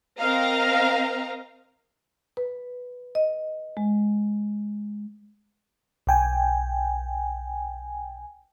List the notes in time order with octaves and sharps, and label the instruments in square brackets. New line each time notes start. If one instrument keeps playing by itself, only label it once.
[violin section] C4 A#4 D#5 F5 A#5
[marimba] B4
D#5
G#3
[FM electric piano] B1 G5 G#5